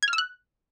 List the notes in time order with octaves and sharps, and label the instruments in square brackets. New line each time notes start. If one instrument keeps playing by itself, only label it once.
[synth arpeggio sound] G#6
F6
E6
F#6